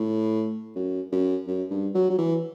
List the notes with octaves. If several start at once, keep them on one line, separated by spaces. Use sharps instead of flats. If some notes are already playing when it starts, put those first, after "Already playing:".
Already playing: A2
F#2
F#2
F#2
G2
F#3
F#3
E3